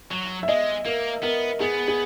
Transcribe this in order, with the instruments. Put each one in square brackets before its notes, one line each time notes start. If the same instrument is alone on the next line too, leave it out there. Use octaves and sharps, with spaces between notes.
[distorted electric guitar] F#3
[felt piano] E5
[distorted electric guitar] G#3 [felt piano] D#5
[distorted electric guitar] A#3 [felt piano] A#4
[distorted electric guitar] B3 [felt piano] A#4
[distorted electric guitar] B3 [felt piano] G#4
[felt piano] G#4